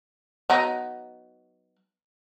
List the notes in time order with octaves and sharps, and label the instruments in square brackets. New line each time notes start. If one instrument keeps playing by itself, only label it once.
[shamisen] F#3 B3 D#4